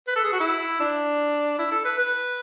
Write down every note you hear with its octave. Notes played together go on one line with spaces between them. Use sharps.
B4
A4
G#4
F#4
E4
D4
E4
A4
B4
B4